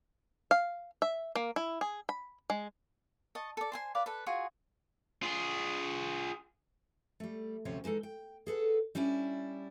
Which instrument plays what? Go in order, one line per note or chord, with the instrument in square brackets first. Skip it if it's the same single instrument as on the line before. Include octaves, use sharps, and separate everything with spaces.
[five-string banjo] F5
E5
A#3
E4
G#4
B5
G#3
[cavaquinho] D#5 A5 C#6
A4 D5
C5 G#5 C6
B4 D5 F5
A4 B4
F4 F#4 G#4 G#5
[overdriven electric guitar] F4 G#4
[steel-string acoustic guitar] G3 A3
D2 C3 F3 C#4 C#5
E3 G#3 D#4 A4
G5
G#4 A4 B4 F#5
G3 C#4 D4 E4 D5